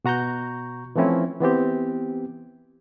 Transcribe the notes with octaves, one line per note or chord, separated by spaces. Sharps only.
B2 F#4 A#5 C#6 G6
E3 F3 A3 C4 C#4 E4
E3 B3 C4 G4